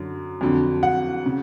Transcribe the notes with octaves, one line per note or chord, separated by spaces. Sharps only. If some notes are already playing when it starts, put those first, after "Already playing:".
Already playing: F#2 D3 F#3
F2 D3 F#3
F#5
C#3